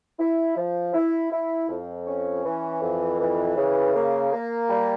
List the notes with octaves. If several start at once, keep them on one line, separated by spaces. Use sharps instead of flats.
E4
F3
E4
E4
F2
C#4
E3
F2
E3
C#3
A#3
A#3
G3